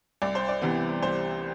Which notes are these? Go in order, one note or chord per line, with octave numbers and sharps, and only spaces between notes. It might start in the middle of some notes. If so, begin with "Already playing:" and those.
C2 D5
C5
D5
C3 E3 B3
C2 C5